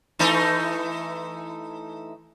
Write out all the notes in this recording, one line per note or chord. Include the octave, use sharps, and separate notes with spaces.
E3 A3 D#4